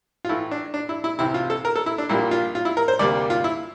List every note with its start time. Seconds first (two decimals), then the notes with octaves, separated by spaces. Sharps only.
0.25 F4
0.29 A2 E3 A3 E4
0.51 D4
0.74 D4
0.89 E4
1.04 E4
1.19 C2 C3 E3 E4
1.34 F4
1.50 A4
1.65 A#4
1.76 A4
1.86 E4
1.98 D4
2.09 A#1 A#2 G3 A#3 E4
2.31 F4
2.55 F4
2.65 E4
2.77 A#4
2.88 C5
2.99 D2 C3 G3 A#3 D5
3.30 F4
3.44 E4